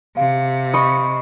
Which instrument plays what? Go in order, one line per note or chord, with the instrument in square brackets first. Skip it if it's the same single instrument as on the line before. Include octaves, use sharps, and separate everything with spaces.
[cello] C3 [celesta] F5
[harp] D#5 B5 C#6